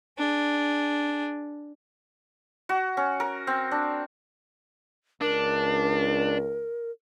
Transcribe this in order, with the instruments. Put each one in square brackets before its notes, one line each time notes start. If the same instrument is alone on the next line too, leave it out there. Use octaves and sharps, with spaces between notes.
[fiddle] D4 G#4
[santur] F#4
C#4
A#4
C4
D4
[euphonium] C#2 [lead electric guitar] D4 [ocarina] A#4